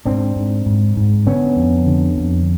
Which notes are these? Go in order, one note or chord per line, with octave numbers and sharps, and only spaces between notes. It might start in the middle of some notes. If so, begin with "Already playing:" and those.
G#2 C4 D4
G#2
G#2
G#2
D3 B3 C#4
F2
D3
F2